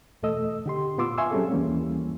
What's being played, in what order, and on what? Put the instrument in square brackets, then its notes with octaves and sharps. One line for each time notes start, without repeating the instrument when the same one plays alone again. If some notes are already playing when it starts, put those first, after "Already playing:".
[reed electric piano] E2 B2 A3 A4 D#5 E6
D3 G4 C6
A#2 B3 F4 C6 D6 E6
E5 F5 G#5 C6 C#6 E6
F#3 G3 C4 C#4 G#4 A4
D#2 E3 G3 A#3 C#4